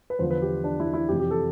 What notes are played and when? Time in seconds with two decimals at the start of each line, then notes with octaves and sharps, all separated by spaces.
0.10 B4
0.19 E2 D3 F3 C5
0.31 B4
0.42 G4
0.64 D4
0.80 E4
0.94 E4
1.08 F2 C3 E3 G4
1.20 G4
1.31 A4